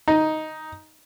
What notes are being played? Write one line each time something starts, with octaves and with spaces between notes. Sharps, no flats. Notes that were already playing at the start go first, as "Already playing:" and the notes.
D#4